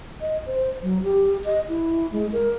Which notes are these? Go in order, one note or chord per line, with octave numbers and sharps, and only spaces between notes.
D#5
C5
F#3
G4
D#5
E4
G#3
A#4